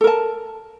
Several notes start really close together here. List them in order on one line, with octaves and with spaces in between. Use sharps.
A4 A#4 A5